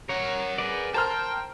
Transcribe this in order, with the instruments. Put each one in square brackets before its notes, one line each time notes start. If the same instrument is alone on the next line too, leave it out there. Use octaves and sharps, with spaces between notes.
[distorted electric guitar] A#4 F#5 [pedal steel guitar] C#5
[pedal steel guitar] G#4 B4 D5
[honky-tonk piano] A#4 C5 F6 [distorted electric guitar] G5 [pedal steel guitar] A5 C6